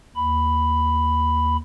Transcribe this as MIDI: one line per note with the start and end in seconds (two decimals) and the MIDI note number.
0.16 1.57 39
0.16 1.57 83